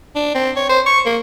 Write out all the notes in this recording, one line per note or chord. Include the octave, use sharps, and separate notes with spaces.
D4
C4
C#5
C5
C#6
A#3